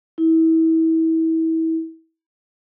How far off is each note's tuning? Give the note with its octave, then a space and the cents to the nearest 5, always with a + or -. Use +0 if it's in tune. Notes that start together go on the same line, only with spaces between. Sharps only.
E4 -30